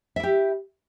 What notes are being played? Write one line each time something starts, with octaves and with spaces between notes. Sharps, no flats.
E4 G4 E5